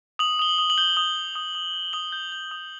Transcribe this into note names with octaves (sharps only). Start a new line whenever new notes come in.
D#6 F#7
D#6 G7
F#7
D#6
F#7
G6 G7
D#6
G6
D#6
D#6
G6
D#6 F#7
G6
G6
D#6